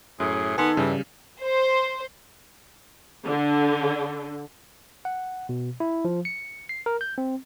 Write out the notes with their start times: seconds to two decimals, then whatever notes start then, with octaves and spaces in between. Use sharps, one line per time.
0.20 F#2 A2 G#4
0.58 D#3 B3 A4 G#5 C6
0.77 G2 C#3 E3 G3
1.43 C5
3.25 D3
5.05 F#5
5.49 B2
5.80 E4
6.05 F3
6.25 C#7
6.69 C7
6.86 A#4
7.01 G6
7.18 C4